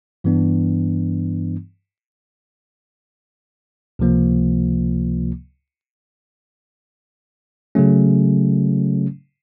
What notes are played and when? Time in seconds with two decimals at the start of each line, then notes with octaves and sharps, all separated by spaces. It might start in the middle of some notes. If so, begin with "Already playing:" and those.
0.24 G2 E3 G3 B3 D4
3.99 C#2 C3 F3 A#3
7.75 C#3 F#3 A3 C#4